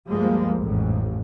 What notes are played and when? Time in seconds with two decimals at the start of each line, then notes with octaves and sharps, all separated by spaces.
0.11 D2 G2 F3 G3 G#3 A#3
0.59 A1 F2 G#2